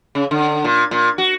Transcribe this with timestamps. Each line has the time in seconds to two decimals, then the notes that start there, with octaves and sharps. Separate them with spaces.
0.15 C#3
0.31 D3
0.64 A#2
0.91 A#2
1.18 F#4